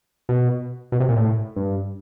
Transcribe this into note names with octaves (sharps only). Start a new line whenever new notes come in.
B2
B2
C3
A#2
A2
G2